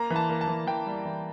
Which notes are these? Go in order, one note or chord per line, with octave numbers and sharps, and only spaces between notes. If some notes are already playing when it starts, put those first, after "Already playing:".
Already playing: A#3 A#5
E3
A5
A#3
A5
E3
E3 G5
G3
E3